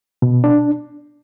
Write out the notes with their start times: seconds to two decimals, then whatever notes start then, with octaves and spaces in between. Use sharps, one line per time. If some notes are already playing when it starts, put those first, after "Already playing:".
0.22 B2
0.44 D4